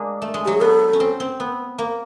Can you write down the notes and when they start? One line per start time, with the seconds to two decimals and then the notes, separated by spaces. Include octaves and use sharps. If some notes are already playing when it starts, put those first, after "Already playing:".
Already playing: G#3 A#3 D4
0.22 A3
0.34 G#3
0.45 F#3 G4
0.53 G#4
0.61 B3 A4 A#4
0.93 C#4
1.00 C4
1.20 C4
1.40 B3
1.78 A#3